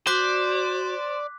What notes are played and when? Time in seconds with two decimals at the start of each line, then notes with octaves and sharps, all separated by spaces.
0.07 F#4 C5 D5 D6 F#6 B6